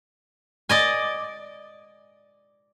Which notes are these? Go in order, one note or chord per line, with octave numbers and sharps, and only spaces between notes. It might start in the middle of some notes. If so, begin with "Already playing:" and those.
D5 D#5 G#5